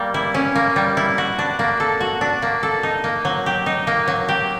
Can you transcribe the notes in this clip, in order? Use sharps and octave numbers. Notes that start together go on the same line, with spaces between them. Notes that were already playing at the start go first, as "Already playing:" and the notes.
Already playing: G3 A#3
E4
C#4
A#3
G3
E4
F#4
D4
A#3
A4
F#4
D4
A#3
A4
D#4
A#3
F#3
G4
D#4
A#3
F#3
G4